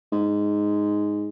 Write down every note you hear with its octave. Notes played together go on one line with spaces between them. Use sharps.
G#2